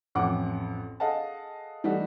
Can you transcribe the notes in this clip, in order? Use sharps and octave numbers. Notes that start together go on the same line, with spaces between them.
A1 F2 F#5 D6
G#4 A4 D#5 F5 F#5 A5
E3 G3 A3 D#4 F#4